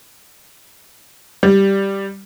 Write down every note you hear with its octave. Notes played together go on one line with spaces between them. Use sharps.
G3